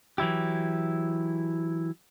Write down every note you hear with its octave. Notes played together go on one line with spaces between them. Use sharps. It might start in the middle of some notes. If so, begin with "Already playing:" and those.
E3 F#3 E4 G4